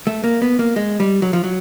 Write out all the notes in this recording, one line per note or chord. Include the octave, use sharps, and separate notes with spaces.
A3
A#3
B3
A#3
G#3
G3
F#3
F3
F#3